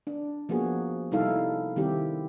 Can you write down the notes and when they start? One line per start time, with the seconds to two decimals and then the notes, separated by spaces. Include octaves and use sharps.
0.07 D4
0.49 F3 A#3 B3 F#4 G#4
1.12 C3 G3 D#4 E4 A4 F5
1.76 D#3 G3 C4 E4 G4